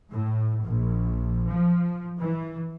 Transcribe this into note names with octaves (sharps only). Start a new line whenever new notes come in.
A2
A#1
F3
E3